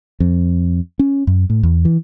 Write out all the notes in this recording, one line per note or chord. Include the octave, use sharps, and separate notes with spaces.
F2
C#4
F#2
A2
E2
E3